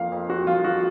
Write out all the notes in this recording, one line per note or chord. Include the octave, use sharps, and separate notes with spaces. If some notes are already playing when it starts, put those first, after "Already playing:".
Already playing: F2 F3 A#3 F5
F2
F2 F#4
F3 F4
F3 F#4